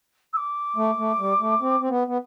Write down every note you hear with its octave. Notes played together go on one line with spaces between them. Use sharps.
E6
D6
A3
A3
G3
A3
C4
C4
B3
B3